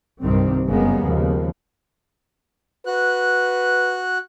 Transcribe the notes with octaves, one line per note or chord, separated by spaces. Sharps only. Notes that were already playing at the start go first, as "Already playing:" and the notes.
C2 G2 C3 D#3 G3 C4
F#1 C#3 G3 G#3 A#3 B3
D#2 C#3 F3
F#4 B4 F#6